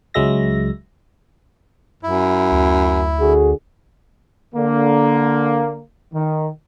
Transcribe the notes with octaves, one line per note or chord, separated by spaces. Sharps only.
C#2 F#3 G#3 E5 A#6
F#2 E4
D2
D3 F#4 G#4
D3 A#3
D#3